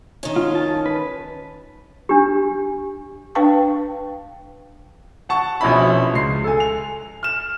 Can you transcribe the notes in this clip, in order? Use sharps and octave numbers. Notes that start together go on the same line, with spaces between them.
D#3 C#4
F4
A5
B4
D4 G4
D4 B4 F5 G5 A5 C#6
F#5 A5 C#6
A#1 B2 C#4 E4 B5
C#2 C7
A4 G#5
F7
F6 E7